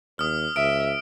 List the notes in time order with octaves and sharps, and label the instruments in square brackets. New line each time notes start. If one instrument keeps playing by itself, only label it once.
[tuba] D#2 [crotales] D#6 F6
[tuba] C#2 [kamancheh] E5 [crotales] D7